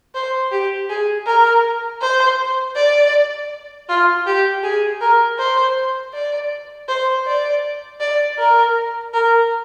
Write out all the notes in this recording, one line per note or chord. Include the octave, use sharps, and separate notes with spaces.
C5
G4
G#4
A#4
C5
D5
F4
G4
G#4
A#4
C5
D5
C5
D5
D5
A#4
A#4